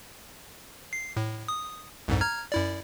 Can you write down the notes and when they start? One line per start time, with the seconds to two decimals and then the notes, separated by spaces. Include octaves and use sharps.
0.93 C7
1.17 A2
1.48 D#6
2.08 C2 F2 G#2
2.21 A#5 F6 G#6
2.52 F#2 E4 D5